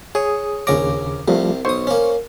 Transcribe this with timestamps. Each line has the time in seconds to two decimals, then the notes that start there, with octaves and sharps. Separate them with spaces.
0.15 G#4 C#5 D#6
0.67 A#1 D#2 C#3 C#4 A#5 D6
1.28 C2 C3 F3 G3 A3
1.65 B1 C5 C#6 D#6
1.87 A#3 C#4